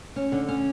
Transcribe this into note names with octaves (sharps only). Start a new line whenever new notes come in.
C#4
D3
C#4